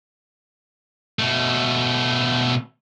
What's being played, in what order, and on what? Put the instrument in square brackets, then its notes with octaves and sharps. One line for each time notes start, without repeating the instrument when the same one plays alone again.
[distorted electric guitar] B2 A3